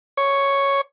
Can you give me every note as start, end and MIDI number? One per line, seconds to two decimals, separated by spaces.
0.17 0.81 73